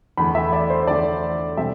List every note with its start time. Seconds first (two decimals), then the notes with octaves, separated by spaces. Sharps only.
0.17 E2 D3 A3 B5
0.35 E5
0.52 D5
0.70 C5
0.87 E2 D3 A3 D5
1.57 C3 G3 E5